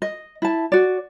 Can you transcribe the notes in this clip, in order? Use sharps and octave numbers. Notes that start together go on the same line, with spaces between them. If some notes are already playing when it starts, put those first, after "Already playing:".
D#5
E4 A5
F#4 D5